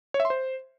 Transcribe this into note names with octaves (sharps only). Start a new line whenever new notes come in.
C#5
E5
C6
C5